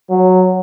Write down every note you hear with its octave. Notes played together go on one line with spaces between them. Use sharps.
F#3